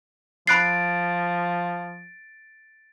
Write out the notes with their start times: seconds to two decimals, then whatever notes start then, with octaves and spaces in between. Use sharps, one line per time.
0.47 F3 B5 F#6 A6 C7 D7